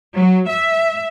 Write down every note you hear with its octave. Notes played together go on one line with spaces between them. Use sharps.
F#3
E5